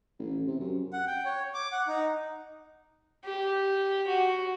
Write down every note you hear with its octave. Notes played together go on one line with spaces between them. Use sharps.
A1
C3
F#2
F#5
G5
C#5
D6
F#5
D#4
G4
F#4